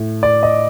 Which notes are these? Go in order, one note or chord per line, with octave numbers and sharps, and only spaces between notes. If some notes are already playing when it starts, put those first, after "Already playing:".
Already playing: A2
D5
D#5